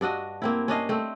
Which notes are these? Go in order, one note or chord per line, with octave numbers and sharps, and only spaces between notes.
G2 D4 F#4 D#5
A#3 C4 E4
C#4 D4 D#5 F5
A3 C4